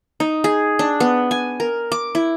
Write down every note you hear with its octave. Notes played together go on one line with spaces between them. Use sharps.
D#4
G#4
D4
B3
G#5
A#4
D6
E4